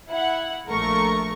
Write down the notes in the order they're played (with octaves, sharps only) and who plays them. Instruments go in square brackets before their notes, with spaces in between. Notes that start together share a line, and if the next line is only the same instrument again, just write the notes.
[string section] E4 F#5
A#1 F3 A3 A#4 C#6